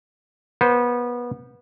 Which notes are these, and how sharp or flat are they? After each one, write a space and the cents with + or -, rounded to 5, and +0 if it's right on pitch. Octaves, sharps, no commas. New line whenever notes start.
B3 -25 C5 -5